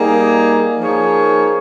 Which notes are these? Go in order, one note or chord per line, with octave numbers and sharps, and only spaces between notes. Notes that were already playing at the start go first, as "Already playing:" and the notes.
Already playing: G3 A#3 D#4 G#4
F3 A#3 D#4 G#4 C#5